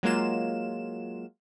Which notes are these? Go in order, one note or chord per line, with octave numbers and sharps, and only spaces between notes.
F#3 G#3 A#3 F4 E7